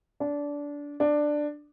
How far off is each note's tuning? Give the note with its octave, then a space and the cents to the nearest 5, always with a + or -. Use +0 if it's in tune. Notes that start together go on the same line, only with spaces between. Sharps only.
D4 -20
D4 +10